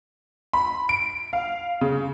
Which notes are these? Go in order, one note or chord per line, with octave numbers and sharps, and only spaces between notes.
B5
D7
F5
C#3